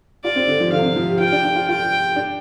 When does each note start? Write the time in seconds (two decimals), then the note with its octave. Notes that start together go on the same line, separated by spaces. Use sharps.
0.24 F4 D5
0.36 C4
0.48 D3
0.60 F3
0.72 D3 F5
0.78 C3
0.84 D3
0.96 F3
1.09 G4
1.20 F4 G5
1.32 D4
1.44 D4
1.56 F4
1.68 F4 G5
2.16 D4